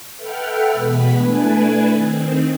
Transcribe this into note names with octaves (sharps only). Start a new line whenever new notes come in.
A4 B4 E5 F#5 G5 F6
E2 B2 G#3 B3 B4 B6
A3 D4 E4 B4 G#5
D#3 C4